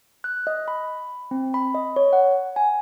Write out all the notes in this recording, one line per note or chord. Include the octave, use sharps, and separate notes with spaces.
F#6
D#5
B5
C4
B5
D#5
C#5
F#5
G#5